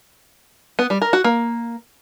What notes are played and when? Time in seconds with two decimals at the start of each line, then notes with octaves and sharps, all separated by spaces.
0.79 B3
0.90 G3
1.02 A#4
1.13 F#4
1.24 A#3